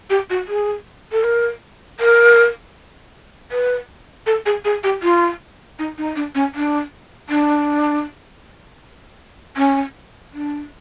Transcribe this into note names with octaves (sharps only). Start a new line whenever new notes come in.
G4
F#4
G#4
A4
A#4
A#4
B4
A4
G#4
G#4
G4
F4
D#4
D#4
D4
C#4
D4
D4
C#4
D4